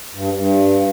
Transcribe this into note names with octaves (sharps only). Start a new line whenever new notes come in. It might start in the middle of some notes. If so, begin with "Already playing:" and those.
G2
G2